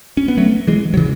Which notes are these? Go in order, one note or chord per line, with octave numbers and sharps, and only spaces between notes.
C#4
B3
F#3 A3
E3 G#3
F#3
C#3 E3